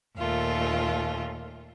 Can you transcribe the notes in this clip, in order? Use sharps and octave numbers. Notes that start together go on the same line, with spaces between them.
D#2 A#2 A3 F4